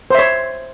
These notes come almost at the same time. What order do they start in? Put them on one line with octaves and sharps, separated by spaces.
C5 E5 C#5